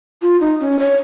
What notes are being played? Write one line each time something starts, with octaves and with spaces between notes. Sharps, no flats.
F4
D#4
C#4
C#5